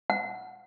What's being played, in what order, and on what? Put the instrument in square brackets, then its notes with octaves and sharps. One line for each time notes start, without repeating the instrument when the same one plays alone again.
[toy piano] F#5